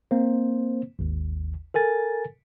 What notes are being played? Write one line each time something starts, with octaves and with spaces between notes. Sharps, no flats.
A#3 C4 C5
G#1 D#2
A4 A#4 G#5 A6